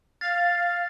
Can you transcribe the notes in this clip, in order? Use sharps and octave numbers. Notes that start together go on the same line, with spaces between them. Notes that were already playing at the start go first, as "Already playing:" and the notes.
F5 A6